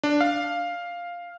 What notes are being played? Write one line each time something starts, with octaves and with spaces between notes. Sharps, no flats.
D4
F5